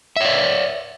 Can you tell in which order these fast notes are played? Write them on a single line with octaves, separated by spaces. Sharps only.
E5 C#5 D5